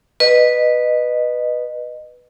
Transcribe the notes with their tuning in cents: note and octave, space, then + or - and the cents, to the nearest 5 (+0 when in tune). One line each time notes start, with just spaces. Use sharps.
B4 +0 D#5 -20